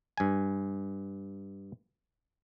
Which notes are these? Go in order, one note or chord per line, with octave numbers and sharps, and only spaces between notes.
G2 G#5